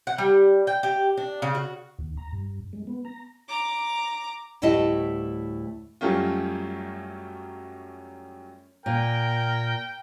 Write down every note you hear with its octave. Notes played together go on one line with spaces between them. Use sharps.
F#5
G3
G5
G4
D4
C#3
F#4
D#2
A#5
G2
G#3
B3
A#5
A#5 D6
D2 A2 G3 E4 D#5 A5
F#2 F#3 G3 A3 C#4 F4
A#2 A#4 G5